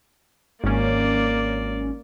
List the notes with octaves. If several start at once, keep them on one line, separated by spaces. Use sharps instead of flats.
G#1 A#3 C#4 D5